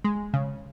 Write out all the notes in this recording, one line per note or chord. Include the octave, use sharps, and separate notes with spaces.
G#3
C#3